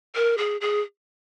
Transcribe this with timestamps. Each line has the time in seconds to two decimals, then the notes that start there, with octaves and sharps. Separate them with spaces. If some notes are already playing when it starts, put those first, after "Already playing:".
0.15 A#4
0.38 G#4
0.61 G#4